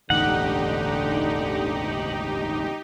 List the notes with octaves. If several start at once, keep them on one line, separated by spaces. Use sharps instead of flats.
E1 A1 D2 D3 D#4 G4 F#5